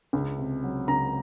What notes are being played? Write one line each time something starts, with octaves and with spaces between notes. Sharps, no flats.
C#2
C3
F#3
C#2 A#5